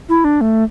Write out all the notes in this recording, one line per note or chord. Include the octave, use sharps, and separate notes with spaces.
E4
D4
A3